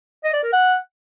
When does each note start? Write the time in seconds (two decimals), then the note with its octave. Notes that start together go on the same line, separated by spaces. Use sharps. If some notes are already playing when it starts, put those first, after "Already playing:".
0.24 D#5
0.34 D5
0.43 A#4
0.53 F#5